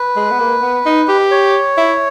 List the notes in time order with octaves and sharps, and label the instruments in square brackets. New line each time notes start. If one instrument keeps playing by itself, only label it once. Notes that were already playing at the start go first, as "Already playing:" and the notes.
Already playing: [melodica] B4
[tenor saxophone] G#3
B3
A#3
B3
D#4
G4
[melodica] C#5
[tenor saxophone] E4